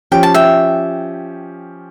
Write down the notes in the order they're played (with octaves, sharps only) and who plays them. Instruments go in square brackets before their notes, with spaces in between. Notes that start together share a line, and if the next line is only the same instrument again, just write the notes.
[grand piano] F3 C#4 G4 [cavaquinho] G5
[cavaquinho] A5
E5 G5